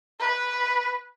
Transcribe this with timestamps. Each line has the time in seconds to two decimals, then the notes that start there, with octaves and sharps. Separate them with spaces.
0.20 B4